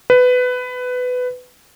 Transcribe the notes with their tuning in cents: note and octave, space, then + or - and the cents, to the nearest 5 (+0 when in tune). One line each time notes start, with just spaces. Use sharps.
B4 +15